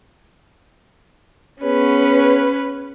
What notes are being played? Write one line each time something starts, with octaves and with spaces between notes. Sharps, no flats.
B3 C#4 G#4 B4 C#5